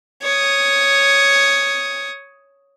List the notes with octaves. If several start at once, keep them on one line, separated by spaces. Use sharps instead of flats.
C#5 D#6